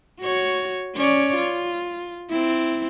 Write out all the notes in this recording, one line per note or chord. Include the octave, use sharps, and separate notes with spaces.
F#4 C#5
C#4 C#5 D5
F4
C4 E4